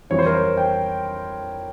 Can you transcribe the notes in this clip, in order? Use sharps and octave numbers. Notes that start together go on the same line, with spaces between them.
F2 E3 G3 C4 C#5
C5
A#4
C5
G5